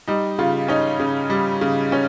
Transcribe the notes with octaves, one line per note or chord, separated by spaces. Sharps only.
G3 D#4
C#3 F4
C#4 D#4
C#3
G3
C#3
C#4